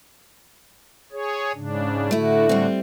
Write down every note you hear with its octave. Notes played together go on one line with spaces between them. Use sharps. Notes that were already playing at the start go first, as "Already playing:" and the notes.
G#4 C#5
G#2 C#3 D4
A2 D3 A3 E4 F#4
G3 C4